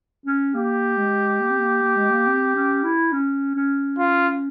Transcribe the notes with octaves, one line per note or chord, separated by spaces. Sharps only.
C#4
A#3 G4
G#3
A#3
C4
A#3
A#3
G#3
A#3
C4
C#4
E4
C#4
C#4
F4